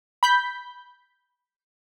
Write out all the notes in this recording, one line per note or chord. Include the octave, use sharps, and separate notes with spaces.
B5 G6 B6